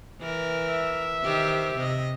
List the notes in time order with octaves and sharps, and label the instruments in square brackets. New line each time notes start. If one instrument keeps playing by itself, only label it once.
[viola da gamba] E3 A#4
[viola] E5
[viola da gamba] D#3 G4 C5
C3 D#5